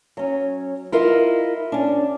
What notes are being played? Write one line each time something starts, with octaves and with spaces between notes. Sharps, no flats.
F#3 C#4
E4 F4 A#4 D#5
C#4 D4